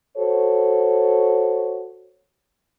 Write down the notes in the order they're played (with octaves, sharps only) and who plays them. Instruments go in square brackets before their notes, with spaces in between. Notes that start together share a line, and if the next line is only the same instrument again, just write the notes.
[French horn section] F#4 A4 C5 C#5